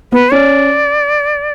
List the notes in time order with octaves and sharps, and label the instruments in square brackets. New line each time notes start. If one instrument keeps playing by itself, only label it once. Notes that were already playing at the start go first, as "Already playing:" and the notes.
[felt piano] B3 [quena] B4
[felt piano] C#4 [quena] D5